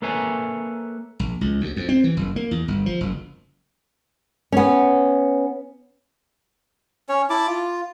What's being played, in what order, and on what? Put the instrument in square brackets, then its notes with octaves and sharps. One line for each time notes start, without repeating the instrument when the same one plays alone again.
[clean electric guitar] A#3 A4 B4 C#5 E5 G#5
[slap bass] A#1
C#2
D2
F2
C4
E3
F#1
A#3
E2
G1
F3
F#1
[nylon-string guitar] B3 C#4
[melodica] C#4 C#5
E4 A5 D6
F4